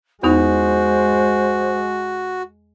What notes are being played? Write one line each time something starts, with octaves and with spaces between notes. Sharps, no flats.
E2 G#3 B3 D#4 F#4 C5